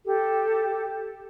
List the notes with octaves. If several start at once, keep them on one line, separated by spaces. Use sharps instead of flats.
G4 A4